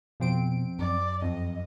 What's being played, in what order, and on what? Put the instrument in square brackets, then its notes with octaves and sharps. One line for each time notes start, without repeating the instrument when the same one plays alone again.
[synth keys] F2 C4 D7 [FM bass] B2
[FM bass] F#2 [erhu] D5
[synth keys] F2 [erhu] D#5